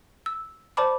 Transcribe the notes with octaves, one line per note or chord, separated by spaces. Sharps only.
E6
C5 D5 A5 B5 D6